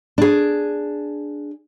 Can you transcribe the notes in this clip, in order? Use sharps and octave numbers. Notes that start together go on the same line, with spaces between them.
D4 G#4